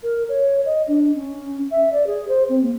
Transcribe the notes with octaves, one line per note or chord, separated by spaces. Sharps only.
A#4
C#5
D#5
D4
C#4
E5
D5
G#4
C5
C4
A#3